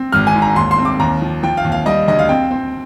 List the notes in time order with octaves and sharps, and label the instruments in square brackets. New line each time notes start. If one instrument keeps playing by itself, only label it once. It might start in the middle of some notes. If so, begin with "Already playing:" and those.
Already playing: [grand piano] C4
G#1 F6
G#5
G#2
A#5
D#2 C6
C6
C4
D6
D#2 A#5
F3
F3 G5
F5
D#2
F5
G3 D#5
D2 D#5
F5
C4 G5
C4